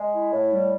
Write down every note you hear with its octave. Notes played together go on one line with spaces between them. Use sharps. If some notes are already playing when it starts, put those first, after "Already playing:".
Already playing: G#3
E4
A2
G3